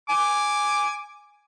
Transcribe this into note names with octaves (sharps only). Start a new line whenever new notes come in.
G#5 D6